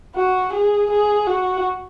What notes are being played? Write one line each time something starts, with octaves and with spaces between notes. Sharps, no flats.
F#4
G#4
G#4
F#4